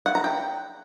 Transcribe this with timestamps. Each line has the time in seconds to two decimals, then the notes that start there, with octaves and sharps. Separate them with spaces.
0.06 F#5
0.15 A#5
0.24 G5